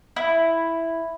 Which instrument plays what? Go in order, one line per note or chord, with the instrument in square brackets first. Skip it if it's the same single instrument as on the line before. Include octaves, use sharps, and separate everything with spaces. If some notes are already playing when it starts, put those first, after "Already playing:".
[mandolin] E4